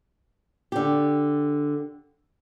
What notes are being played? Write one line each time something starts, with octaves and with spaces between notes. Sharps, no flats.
D3 G4